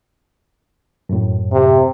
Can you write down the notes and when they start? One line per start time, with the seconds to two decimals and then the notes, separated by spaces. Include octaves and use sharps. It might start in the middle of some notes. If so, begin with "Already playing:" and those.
1.09 F#2 A2
1.52 C3